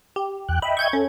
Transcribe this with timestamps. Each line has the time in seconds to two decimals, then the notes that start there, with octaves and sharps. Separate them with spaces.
0.16 G4
0.49 E2 G5 F#6
0.62 D#5 E5 G5 B5
0.77 C#6 G6 G#6
0.93 C#4 A4